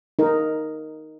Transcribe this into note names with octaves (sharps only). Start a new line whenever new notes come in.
D#4 A#4